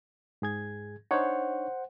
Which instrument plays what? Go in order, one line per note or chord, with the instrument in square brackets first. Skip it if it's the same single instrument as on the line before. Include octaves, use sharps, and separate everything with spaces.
[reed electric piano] G#2 G#4 G#6
[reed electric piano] D4 D#4 C#5 [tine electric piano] C5 F#5